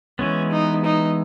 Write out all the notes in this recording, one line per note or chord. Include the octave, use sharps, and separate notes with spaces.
E3 G#3 B3 C#4
D#4
D#4